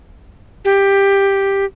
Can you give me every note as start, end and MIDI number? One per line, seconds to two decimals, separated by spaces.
0.65 1.65 67